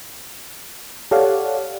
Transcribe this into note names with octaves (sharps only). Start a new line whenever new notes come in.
G4 A4 C#5 D5 F5 F#5